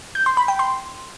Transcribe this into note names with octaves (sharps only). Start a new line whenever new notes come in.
G6
C6
B5
G5
C6